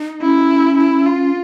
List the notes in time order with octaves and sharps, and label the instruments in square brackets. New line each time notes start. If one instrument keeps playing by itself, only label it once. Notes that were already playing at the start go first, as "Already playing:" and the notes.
Already playing: [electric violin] D#4
[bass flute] C#4 [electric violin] E4
[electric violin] E4
F4